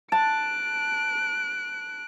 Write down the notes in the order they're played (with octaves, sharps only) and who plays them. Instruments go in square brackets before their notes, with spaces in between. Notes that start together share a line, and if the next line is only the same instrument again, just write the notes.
[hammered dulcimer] A5 [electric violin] F#6 D7